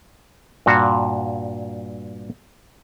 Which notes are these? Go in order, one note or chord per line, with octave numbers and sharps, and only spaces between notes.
G2 A#2 F#4 F5